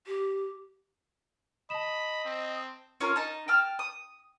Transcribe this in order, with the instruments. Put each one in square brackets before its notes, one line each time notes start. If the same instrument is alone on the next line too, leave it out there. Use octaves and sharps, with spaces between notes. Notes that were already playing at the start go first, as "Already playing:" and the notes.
[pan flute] G4
[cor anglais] D#5 [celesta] A5 E7 [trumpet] B5
[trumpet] C4
[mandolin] C#4 F4 A#4
D#4 A5
G5 A5 F6
D#6